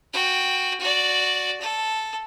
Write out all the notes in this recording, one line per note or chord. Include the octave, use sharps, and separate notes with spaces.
F#4 G5
F#4 D5
A4